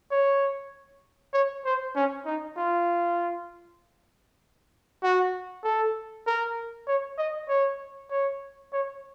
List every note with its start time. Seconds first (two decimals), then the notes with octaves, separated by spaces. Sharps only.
0.11 C#5
1.33 C#5
1.65 C5
1.96 C#4
2.26 D#4
2.57 F4
5.03 F#4
5.64 A4
6.27 A#4
6.87 C#5
7.18 D#5
7.48 C#5
8.10 C#5
8.73 C#5